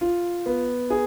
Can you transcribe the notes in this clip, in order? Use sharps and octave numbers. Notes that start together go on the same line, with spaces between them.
F4
B3
G#4